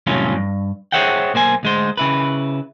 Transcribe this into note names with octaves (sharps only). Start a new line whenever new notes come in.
C2 F2 A2 F#3 C#4 F4
G2
G#4 C5 C#5 E5 F#5 G5
B1 A#3 C5 G#5
D2 G#3 C5
C#3 E4 B4